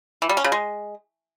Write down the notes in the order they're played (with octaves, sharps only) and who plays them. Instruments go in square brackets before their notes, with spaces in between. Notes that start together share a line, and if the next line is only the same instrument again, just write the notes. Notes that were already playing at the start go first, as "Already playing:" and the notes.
[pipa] E3
G3
C#4
C#3
G#3